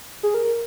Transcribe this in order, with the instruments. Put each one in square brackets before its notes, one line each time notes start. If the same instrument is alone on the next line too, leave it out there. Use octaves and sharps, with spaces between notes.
[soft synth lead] G#4
A#4